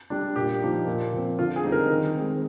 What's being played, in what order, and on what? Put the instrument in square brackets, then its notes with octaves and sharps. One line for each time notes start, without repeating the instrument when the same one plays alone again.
[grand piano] G3 D4
A#2 G4
F3 A#3 D#4
A#2
F3 C4
D3 F4
G#4
G3 C4 D#4
A#4
D#3
G#3 C4